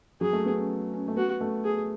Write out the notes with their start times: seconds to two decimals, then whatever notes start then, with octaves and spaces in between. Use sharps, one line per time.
0.21 F#3 G#4
0.33 A3
0.46 B3
0.58 C#4
0.93 C#4
1.08 A3
1.16 B3 F#4
1.41 A3
1.64 G#4